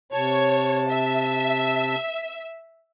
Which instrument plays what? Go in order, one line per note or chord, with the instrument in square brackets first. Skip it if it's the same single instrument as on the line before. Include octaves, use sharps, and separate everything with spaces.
[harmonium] C3 A5 [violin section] C#5
[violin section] E5